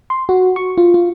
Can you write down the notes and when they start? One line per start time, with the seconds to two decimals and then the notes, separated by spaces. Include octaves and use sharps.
0.10 C6
0.29 F#4
0.56 C#6
0.78 F4
0.94 F4